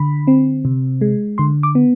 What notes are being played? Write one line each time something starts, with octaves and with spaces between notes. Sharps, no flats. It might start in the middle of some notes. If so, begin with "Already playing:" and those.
Already playing: D3 B5
C4
C3
G#3
D3 C6
D6
B3